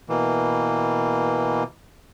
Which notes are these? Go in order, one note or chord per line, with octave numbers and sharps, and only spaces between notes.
B2 E3 A#3